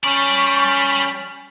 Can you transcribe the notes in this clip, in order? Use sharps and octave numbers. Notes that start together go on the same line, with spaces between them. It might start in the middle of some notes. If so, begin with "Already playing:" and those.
G3 C#4 D5 B5 C#6